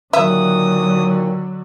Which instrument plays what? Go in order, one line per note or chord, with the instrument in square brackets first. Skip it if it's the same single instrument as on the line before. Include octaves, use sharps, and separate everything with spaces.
[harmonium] A#2 D#3 [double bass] D3 F#3 [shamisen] E5 [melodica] D#6